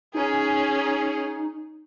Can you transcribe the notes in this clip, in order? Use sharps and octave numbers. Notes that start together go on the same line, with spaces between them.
C#4 D#4 G#4